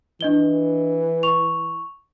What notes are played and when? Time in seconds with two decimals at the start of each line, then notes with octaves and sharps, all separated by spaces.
0.21 E3 D4 D#5 G7
1.23 C#6 F7